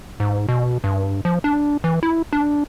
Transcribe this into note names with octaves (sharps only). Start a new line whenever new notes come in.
G#2
B2
G2
F3
D4
E3
E4
D4